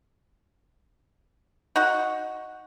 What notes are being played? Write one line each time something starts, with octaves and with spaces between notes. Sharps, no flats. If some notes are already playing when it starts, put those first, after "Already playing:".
D#4 F#4 F#5